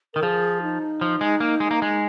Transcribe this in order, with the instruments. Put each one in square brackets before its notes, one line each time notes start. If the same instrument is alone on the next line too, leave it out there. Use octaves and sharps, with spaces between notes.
[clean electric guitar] D#3 [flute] A#4
[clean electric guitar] F3 [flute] G#4
[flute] D#4
[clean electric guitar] F3
G#3
A#3
G#3
A#3
G#3